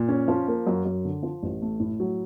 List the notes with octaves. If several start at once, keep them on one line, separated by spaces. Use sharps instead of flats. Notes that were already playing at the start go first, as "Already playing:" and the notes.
Already playing: A#2
C#4
F3
A#3
F#2
F#2
D3
F3
A1
A3
A2
F#3